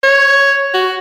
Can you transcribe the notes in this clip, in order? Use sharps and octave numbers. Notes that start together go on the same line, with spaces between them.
C#5
F#4